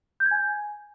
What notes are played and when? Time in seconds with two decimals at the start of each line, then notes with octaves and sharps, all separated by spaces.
0.20 G6
0.26 G#6
0.31 G#5